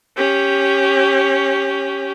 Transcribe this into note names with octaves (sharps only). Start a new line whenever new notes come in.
C#4 G4